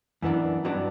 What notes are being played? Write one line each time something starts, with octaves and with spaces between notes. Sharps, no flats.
F#2 E3 B3 D4
G2 F#3 B3 D4